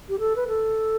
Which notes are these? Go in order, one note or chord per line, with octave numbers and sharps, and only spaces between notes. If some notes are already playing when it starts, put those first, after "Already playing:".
G4
A4
B4
A4